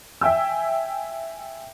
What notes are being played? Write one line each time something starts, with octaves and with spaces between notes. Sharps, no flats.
E5 G5 G#5 E6